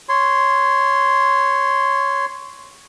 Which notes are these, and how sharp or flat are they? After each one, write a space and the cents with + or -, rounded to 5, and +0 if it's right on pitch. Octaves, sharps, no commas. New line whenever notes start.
C#5 +0 C6 -10